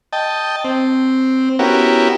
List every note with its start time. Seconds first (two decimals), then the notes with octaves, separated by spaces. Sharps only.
0.13 D#5 G5 A5
0.64 C4
1.59 B3 C#4 E4 F#4 G4 A#4